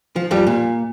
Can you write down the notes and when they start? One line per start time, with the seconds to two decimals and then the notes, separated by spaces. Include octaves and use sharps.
0.16 F3
0.31 F2 G3
0.47 A#2